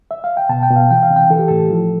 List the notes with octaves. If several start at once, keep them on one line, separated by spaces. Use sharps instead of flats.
E5
F5
G5
B2 A5
G5
B2
F5
E3 G5
F5
C3
G5
E3 A4
G4
A2 A4
F3